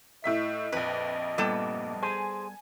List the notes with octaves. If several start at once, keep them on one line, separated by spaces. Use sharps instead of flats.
A2 D#5 E5 B6
A#1 F2 B4
G2 A#2 G3 B3 A4
G#4 C5 G#5